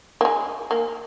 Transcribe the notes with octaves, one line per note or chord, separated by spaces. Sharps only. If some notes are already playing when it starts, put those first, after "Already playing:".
A#3
G#3
A#3